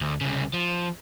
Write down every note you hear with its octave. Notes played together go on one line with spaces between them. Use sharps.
D2
C2 C#3
F3